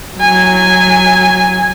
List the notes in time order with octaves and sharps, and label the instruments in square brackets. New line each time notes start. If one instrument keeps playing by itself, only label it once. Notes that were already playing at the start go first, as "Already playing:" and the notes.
[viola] F#3 G#5